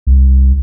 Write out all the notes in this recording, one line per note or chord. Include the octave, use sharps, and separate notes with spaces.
C2